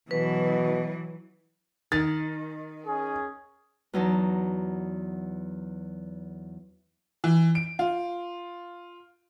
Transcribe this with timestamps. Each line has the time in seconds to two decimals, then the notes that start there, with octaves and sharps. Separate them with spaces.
0.11 B2 E3 F#3 B4
1.92 D#3 A6
2.86 C#4 G#4
3.93 E2 F#3 D#4 A5
7.24 E3
7.55 D7
7.79 F4